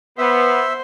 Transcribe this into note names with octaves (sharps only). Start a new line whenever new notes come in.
B3 C5 E5